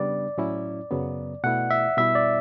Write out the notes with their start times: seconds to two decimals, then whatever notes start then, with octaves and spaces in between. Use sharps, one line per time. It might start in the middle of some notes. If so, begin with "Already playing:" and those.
Already playing: C#3 G3 B3 D4 D5
0.38 A2 F#3 C#4 E4
0.91 F#2 C#3 F#3 B3
1.44 B2 A3 E4 F#5
1.71 E5
1.97 B2 G3 B3 E4 E5
2.15 D5